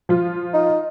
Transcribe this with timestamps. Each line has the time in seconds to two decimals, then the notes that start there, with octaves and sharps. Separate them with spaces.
0.09 F3 F4
0.54 D#4